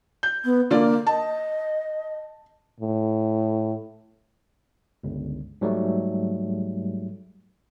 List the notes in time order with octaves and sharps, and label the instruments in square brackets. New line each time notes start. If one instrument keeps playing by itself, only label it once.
[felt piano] G6
[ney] B3
[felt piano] D3 F4 D5 [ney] A#3
[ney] D#5 [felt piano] A5
[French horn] A2
[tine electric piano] G1 C#2
G#2 F#3 G3 A3